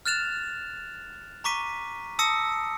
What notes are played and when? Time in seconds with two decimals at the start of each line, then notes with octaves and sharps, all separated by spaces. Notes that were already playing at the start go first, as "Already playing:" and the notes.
0.06 F6 F#6 A6 E7 F7
1.44 A#5 C#6 D6 B6 D#7
2.19 A5 D#6 E6 A#6 C#7